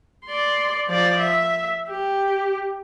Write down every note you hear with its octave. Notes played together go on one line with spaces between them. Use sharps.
D5 C6
F3 D5
E5
G4